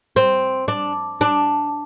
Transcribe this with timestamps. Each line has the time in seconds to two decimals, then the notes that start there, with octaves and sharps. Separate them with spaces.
0.16 C4
0.68 D4
1.21 D4